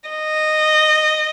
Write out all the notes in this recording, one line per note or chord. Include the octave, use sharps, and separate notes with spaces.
D#5